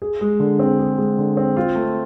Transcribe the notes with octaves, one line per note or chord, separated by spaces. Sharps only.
G#4
G#3
D3
C4
G#4
G#3
D3
C4
F4
A3